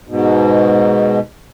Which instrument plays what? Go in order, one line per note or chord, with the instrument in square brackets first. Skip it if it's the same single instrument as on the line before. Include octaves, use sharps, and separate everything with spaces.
[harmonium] G#2 B2